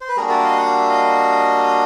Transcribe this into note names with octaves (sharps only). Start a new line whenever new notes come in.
C5
B4
G3 A#3 D4 F#4 G#4 A#4
D5 E5
D#5 F5
F#5
F5
E5
D#5 F5